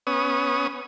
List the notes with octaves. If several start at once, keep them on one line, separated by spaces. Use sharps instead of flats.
B3 C#4 D#6